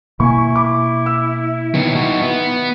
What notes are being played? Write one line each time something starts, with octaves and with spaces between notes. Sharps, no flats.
B2 A#3 E4 G#5 C#6
B5 D6
E6
D#3 B3 D#4
D#4 F#4
B3